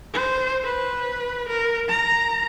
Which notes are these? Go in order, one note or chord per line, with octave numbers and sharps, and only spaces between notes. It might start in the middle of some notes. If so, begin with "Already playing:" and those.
C5
B4
A#4
A#5